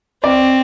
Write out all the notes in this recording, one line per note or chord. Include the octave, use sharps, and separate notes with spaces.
C4 D5